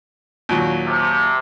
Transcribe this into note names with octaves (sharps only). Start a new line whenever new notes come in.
D#2 A#2 F#3
C3